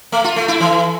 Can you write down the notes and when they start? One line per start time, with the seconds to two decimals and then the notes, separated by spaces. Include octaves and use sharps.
0.12 A3
0.24 F4
0.36 A3
0.48 E4
0.60 E3